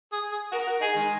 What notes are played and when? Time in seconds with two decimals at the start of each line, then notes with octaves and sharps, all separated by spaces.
0.12 G#4
0.32 G#4
0.52 F#4 A#4
0.67 F#4
0.81 D#4 G#4
0.96 D#3 G#3